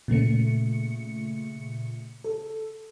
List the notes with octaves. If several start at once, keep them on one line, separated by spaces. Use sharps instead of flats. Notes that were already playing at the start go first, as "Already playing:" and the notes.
A#2 C#3 A3 C#7
A4